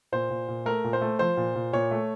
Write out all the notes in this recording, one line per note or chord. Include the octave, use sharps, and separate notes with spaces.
A#2 C5
A#2
A#2
A3 A#4
A#2
C5
A3
F3 C5
A#2
A#2
A#2 C#5
A3